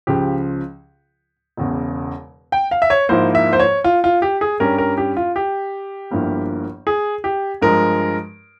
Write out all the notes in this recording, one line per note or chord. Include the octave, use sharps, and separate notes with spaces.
C#2 C#3 F3 G4
E1 E2 C#3
G5
F5
E5
C#5
G#2 F3 A#3 E4 C5
E5
C5
C#5
F4
F4
G4
G#4
G2 G3 C#4 A#4
A#4
G4
F4
G4
G1 G2 F3 A#3 E4
G#4
G4
G2 F3 G#3 A#4